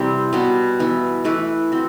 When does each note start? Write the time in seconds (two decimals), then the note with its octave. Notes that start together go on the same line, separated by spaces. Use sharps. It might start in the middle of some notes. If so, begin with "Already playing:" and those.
Already playing: C3 E3 G3 C4 E4
0.33 B2 G3 B3 F#4
0.80 E3 B3 E4
1.24 E3 A3 E4 B4
1.72 C4 F#4